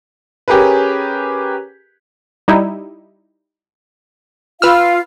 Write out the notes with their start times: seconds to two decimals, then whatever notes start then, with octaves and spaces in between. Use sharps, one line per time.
0.48 C#4 G4 G#4 A#4 B4
2.48 G3 D#4 E4
4.62 F4 B4 F5 E6 F6